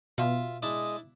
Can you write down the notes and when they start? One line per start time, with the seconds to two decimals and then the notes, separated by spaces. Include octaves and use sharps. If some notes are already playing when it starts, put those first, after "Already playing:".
0.18 B2 F4 E5 F5
0.63 G#3 D4 E4 D#5 A5 D#6